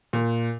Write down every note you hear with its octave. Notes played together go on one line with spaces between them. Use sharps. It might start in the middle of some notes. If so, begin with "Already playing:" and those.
A#2